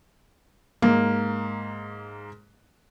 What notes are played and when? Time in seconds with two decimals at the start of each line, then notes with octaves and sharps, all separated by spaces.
0.82 G#2 A#3